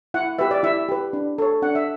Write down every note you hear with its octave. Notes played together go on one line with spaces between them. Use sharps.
E4 F#5
G4 B4 E5
D5
E4 E5
G4 B4
D4
A4 C#5
D4 F#5
E5